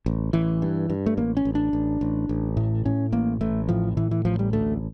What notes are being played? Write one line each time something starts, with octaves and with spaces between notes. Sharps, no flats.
A1
A1 E3
G2
G2
A3
A1 A#3
C#4
A1
D4
A1
A1
A1
A2
A2 C#4
A1 A#3
A1 A3
A2 F3
A2 E3
E3
A1 F3
G3
D2 A3